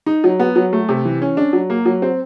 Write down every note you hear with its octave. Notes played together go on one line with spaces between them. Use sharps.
D#4
F#3
B3
F#3
A3
C3
E3
C#4
D4
F#3
A#3
F#3
C4